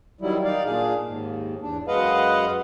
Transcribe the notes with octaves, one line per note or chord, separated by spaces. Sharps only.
D#3 F#3 G3 E4
D#3 D#4 D5 F5
A#2 D4 G#4 F5
D#2 G#2
E2 D4
F#2 G#3 B4 D#5 F5 F#5